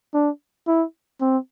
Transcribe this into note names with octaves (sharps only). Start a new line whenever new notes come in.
D4
E4
C4